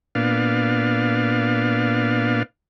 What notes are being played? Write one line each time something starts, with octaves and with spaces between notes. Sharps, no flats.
A#2 B3 D4 F5